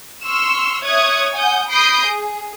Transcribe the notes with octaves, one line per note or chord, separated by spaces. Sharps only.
C6 C#6 E6 F6
C#5 E5 C#6 D#6 F#6 G#6
F#5 G#5 D#6 G6
B5 D#6 G6 A#6 C7 D7
G#4